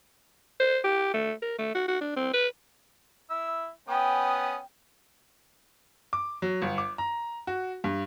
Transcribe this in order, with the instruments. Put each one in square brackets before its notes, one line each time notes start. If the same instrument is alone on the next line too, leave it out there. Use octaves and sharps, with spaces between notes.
[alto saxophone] C5
G4
A3
A#4
A3
F#4
F#4
D4
C4
B4
[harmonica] E4 E6
[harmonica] B3 C#4 D#6 [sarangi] G5
[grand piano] D6
F#3
G1
D6
A#5
F#4
G2